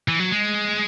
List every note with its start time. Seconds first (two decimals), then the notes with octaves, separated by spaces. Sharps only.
0.08 E3
0.20 F#3
0.31 G#3